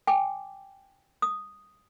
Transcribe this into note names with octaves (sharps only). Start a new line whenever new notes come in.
G5 G#5 D6
D#6